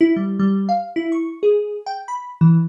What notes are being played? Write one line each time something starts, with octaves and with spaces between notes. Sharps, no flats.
E4
G3
G3
F5
E4
C#6
G#4
G5
B5
E3